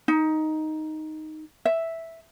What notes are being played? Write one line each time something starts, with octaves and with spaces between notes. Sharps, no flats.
D#4
E5